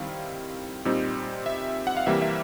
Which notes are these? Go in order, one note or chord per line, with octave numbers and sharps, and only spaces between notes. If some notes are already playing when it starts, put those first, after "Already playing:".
Already playing: D#3 G3 C4 E4 F5
A#2 G3 C4 D#4
E5
F#5
F5
C3 E3 G3 A#3 E5
E5